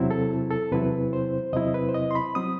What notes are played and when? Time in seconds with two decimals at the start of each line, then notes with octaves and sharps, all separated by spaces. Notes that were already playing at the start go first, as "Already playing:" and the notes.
Already playing: E2 C3 F#3 C4 E4
0.11 A4
0.51 A4
0.71 E2 C3 F#3 C4 E4 B4
1.13 C5
1.53 E2 C3 F#3 C4 E4 D#5
1.74 B4
1.89 C5
1.94 D#5
2.11 C6
2.15 B5
2.35 F#3 C4 D#6